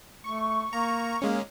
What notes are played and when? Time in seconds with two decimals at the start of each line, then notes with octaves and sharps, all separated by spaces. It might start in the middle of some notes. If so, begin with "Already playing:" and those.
0.24 A3 C#6
0.73 A#3 A#5
1.22 G#3 A#3 C#4